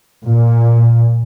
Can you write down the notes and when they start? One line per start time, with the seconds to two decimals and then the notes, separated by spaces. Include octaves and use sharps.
0.25 A#2